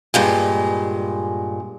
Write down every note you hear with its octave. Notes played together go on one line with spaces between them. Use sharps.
G2 A#2 G#3